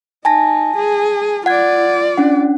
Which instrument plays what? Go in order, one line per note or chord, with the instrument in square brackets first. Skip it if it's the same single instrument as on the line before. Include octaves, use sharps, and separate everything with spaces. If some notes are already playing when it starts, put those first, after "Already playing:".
[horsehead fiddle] D#4 [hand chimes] G#5 A5 A#6
[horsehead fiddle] G#4
[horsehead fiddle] F4 D5 [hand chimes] F#5 G#6
[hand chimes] C#4 D4 F#5